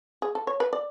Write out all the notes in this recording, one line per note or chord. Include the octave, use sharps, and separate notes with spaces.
G#4
A4
C#5
B4
D5